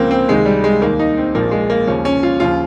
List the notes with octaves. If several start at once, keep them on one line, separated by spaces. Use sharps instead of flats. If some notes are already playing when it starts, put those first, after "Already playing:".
Already playing: C#2 C#3 F3 A#3 C4
C4
C#2 C3 D#3 G#3
G3
G#3
D#2 D#3 A#3
D#4
C4
A#1 A#2 F3 A#3
G#3
A#3
D#2 C#3 F3 C#4
C#4
F4
D#2 C#3 F3 F4